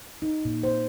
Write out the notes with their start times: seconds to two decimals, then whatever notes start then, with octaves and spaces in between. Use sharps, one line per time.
0.22 D#4
0.45 A#2
0.63 C5